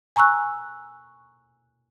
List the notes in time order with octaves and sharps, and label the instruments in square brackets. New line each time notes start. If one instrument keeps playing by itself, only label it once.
[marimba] G#5 A#5 C#6 E6 F#6